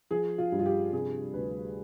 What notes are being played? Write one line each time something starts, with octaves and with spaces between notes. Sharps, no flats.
F3 G#4
F4
G2
F4
G4
C3 G#4
D2 B4